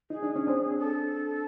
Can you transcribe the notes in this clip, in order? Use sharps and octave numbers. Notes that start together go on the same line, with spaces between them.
D#4 G#4
D4
C#4
C4 D4
A4